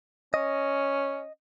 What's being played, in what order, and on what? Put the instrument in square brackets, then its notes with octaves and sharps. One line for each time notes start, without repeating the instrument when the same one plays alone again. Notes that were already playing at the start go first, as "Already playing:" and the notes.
[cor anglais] C#4 [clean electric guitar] D#5